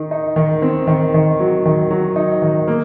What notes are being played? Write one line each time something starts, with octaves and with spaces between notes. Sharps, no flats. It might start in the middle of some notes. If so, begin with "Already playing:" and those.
Already playing: D#3 D#4
D#4
D#3
C4
D#3
D#3
F#3
D#3
F#3
D#4
D#3
A#3